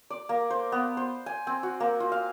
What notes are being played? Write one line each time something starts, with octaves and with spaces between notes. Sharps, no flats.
D5
A#3
C5
B3
C5
G#5
C4
F#4
A#3
F4
F5